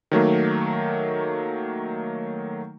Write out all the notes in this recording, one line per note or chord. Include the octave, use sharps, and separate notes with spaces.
D#3 F#3 A3 A#3